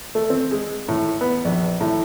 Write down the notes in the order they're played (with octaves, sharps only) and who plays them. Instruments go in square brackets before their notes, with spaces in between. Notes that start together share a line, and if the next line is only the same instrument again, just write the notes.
[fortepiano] A3
C4
G#3
A2
B3
A#1
A2